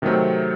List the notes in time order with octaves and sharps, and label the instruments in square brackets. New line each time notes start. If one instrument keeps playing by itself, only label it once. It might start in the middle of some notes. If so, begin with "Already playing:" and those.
[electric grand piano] C3 D#3 F#3 A3 C4